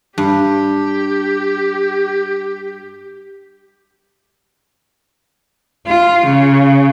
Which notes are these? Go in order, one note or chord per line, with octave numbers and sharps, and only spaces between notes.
G2 G4
F4
C#3